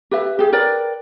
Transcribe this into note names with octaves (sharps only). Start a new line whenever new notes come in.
G4 B4 E5
G4 G#4
A#4 B4 D5 G5